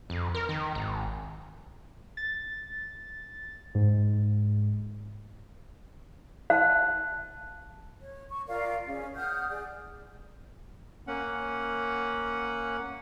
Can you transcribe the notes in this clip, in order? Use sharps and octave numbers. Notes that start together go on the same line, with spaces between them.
F2
A#4
D#3
G#1
A6
G#2
F5 A5 F#6
C#5
C#6
F4 A#4 D5 F5
C#4 G#4
F#5 D#6 F6 G6
G#4 D5
A#3 C#4 F#5